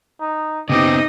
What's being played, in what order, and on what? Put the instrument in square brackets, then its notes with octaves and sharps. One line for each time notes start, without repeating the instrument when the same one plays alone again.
[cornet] D#4
[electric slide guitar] C#3 B3 C4 [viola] D#4 D#5 [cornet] G4